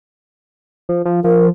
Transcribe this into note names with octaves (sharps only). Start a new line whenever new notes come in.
F3
F3
F3 A#4